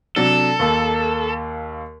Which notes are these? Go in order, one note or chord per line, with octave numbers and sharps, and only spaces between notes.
C3 F#3 D4 A4
D#2 A#3 E6